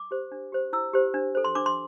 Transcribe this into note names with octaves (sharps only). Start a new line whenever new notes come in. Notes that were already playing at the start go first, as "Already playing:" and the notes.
Already playing: D6
G4 C5
D4
G4 C5
E4 E6
G4 C5
D4
A4 C5
C6
D4 D6
C6